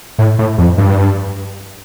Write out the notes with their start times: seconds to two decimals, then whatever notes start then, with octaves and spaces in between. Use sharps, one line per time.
0.18 A2
0.39 A2
0.58 F2
0.78 G2